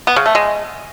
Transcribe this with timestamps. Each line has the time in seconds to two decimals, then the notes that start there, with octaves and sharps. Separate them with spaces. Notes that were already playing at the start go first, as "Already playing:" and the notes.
0.07 B3
0.16 C#3
0.26 A3
0.35 G#3